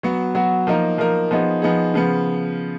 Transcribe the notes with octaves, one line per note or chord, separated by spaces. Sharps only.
F#3 B3 F#4
F#3 B3 F#4
F3 A#3 D#4 A#4
F3 A#3 D#4 A#4
F3 B3 D#4 G#4
F3 B3 D#4 G#4
C#3 F3 B3